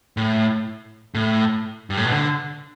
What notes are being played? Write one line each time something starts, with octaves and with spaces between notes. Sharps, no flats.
A2
A2
G2
A2
B2
D3